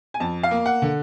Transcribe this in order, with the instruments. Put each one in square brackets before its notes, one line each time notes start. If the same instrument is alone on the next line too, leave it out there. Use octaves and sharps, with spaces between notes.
[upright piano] G#5
F2 A5
F5
A#3
F#5
D3